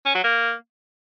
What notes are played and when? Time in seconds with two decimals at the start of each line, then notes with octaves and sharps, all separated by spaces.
0.06 C#4
0.15 F#3
0.24 A#3